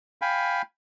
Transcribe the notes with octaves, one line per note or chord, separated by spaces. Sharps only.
F5 G5 G#5 B5